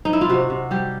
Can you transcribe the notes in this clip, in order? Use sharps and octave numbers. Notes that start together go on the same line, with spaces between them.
D#4
E4
F4
C3 F#4
C3
G3 G4